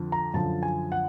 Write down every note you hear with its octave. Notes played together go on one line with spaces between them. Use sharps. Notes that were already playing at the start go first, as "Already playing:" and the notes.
Already playing: F2 D3 F3
A#5
F#2 D3 F3 A5
G#5
F#5